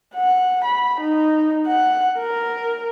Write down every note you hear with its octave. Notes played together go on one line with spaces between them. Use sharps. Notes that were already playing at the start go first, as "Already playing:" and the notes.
F#5
B5
D#4
F#5
A#4